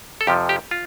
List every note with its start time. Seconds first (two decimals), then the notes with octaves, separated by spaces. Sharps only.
0.21 A4
0.27 F2 C3 F3 G4
0.49 G4
0.71 F4